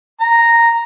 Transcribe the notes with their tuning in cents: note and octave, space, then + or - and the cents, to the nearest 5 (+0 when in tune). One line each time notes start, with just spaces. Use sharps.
A#5 -5